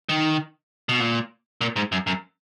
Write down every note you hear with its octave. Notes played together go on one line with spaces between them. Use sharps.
D#3
B2
A#2
A#2
G#2
F#2
F#2